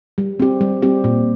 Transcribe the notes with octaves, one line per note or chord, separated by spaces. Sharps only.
G3
C4 G4
G3
C4 G4
A#2